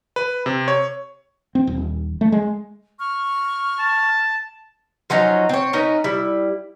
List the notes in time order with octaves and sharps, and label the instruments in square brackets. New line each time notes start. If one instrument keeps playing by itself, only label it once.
[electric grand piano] B4
C3
C#5
[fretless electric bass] C4
D#1
A3
G#3
[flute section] C#6 F6
[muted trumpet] A5
[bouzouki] F3 F#3 C#4 D#4
C4 C#5
C#4 D#4 A#4 B4
G3 E4